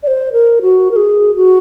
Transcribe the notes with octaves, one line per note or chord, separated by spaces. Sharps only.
D5
C5
A#4
F#4
A#4
G#4
F#4